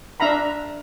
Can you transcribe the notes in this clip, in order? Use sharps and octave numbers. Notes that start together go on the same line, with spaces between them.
D4 E5 F5 A#5 B5